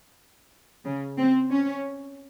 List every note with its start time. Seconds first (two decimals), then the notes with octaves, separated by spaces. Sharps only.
0.85 C#3
1.18 C4
1.51 C#4